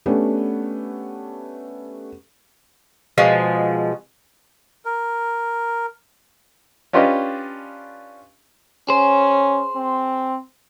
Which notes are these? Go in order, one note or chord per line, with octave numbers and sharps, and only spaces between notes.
A3 B3 C#4 D4 G4
B2 F3 G#3
A#4
C#4 D4 F4 G4 B4 D#5
C#4 G#4 C5
C4